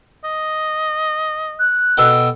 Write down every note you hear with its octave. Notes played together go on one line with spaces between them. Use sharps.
D#5
F#6
B2 A4 G5